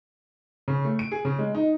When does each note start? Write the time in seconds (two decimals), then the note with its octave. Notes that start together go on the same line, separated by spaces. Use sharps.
0.68 C#3
0.85 A3
0.99 D7
1.12 G#4
1.25 C#3
1.39 G#3
1.55 D#4